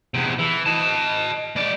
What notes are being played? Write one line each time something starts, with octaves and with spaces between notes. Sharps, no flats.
E2 C3
E3
D#5 A5
G#3 D5